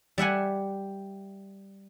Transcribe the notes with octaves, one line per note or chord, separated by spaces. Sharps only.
G3 E5 F#5 G#5